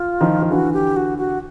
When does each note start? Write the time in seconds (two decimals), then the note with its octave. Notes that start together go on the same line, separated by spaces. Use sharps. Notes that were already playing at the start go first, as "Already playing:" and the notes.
Already playing: F4
0.21 D#3 F3
0.42 F3
0.51 D3 E3 F#4
0.74 G4
0.96 F#4
1.18 F#4